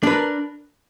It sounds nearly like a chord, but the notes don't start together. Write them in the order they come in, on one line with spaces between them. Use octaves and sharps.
D4 B4 A#4